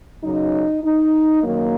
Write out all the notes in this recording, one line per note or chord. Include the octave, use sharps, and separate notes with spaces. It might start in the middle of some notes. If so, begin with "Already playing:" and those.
F#2 C#3 F#3 D#4
D#4
F#2 D#3 F#3 A#3